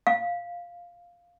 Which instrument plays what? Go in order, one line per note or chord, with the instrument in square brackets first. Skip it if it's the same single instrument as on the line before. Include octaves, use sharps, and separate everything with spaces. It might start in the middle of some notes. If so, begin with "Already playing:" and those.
[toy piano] F5